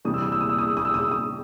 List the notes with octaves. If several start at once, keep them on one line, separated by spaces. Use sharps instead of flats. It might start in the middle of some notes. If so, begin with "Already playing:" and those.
C3 E3 G3 D#6
E6
D#6
E6
D#6
E6
D#6
E6
D#6
E6
D#6
E6
D#6